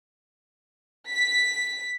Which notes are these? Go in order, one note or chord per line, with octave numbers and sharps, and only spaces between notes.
B6